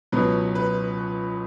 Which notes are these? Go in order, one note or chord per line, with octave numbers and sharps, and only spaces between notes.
C#2 B2 F#3 B4
B4